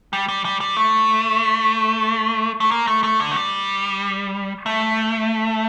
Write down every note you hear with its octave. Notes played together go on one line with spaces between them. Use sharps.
G3
G3
G3
G3
A3
A3
A#3
A3
A3
D3
A3
G3
A3